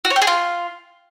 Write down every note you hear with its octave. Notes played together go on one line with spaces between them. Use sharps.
F#4
C#5
G4
G#4
F4